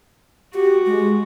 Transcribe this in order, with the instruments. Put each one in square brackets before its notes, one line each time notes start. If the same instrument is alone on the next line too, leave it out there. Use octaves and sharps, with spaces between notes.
[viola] F#4 [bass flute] G4
[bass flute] G#3